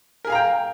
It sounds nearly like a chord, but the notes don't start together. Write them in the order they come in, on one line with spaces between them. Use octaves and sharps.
A#4 G#4 F5 A#5 G5